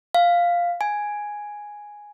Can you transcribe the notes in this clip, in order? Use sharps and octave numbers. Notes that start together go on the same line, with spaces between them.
F5
G#5